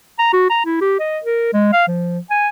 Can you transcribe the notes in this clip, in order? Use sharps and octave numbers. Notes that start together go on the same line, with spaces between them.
A#5
F#4
A#5
E4
G4
D#5
A#4
G#3
F5
F3
G#5